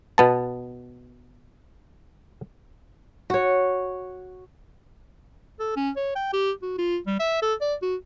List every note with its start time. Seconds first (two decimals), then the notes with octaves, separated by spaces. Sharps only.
0.18 B2 B3 A5
3.30 F#4 C#5
5.59 A4
5.76 C#4
5.96 C#5
6.16 G5
6.33 G4
6.62 F#4
6.78 F4
7.06 G3
7.19 E5
7.42 A4
7.61 D5
7.82 F#4